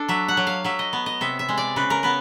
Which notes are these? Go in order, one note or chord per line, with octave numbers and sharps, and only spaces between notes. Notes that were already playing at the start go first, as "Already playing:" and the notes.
Already playing: D4 A4
F#3 E5
F#5
F#3
F5
F#3 E5
D#5
B3
D#5
C3 E5
E5
G#3
D5
C#3 B4
A#4
B3 B4